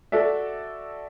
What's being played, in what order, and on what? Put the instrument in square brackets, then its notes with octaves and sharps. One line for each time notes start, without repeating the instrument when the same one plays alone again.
[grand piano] F#4 A4 D5 E5